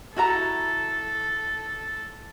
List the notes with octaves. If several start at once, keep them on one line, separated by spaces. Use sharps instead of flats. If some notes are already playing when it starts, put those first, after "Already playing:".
E4 F#4 A4 A#5